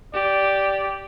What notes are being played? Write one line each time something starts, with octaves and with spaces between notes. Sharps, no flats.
G4 D5